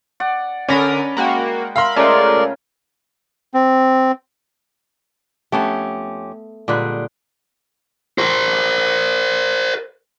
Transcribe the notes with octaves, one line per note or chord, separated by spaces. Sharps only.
D5 F#5
D3 C#4 A#4 D5 B5 D6 D#6
G#3 A#3 F#4 F#5 G5
A#4 E5 F5 B5 C6
C#3 G#3 A3 F4 A#4 D5
C4
F2 A3 B3 C#4 G4 A4
A#2 D3 G3 G#3 B4
A#4 C5